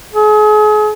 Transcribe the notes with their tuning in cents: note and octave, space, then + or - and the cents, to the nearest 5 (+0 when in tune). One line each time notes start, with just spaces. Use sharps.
G#4 +35